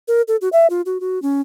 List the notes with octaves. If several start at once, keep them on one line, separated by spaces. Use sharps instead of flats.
A#4
A4
F#4
E5
F4
F#4
F#4
C#4